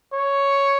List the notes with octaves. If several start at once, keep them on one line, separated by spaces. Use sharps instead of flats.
C#5